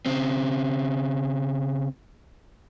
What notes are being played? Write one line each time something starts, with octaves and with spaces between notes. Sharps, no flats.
C#3 C4